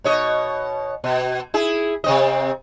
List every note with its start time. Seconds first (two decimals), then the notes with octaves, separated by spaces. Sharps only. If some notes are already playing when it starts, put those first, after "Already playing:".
0.04 B2 C#5 D#5
1.04 B2
1.54 E4 G#4
2.04 C3 C4 D#5